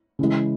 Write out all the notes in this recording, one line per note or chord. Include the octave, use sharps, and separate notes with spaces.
C#3 E3 G#3